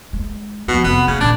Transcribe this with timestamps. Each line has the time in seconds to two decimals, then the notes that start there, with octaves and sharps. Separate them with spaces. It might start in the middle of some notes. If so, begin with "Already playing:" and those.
0.13 G#3
0.68 B2 F3 B3
0.84 F2 C3 B3
1.08 C#3 A3
1.21 A#2 D#3 D4